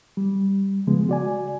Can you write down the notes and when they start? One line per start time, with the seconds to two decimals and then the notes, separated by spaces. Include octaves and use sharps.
0.17 G3
0.87 C#3 F3 G#3 B3
1.09 F#4 D5 G#5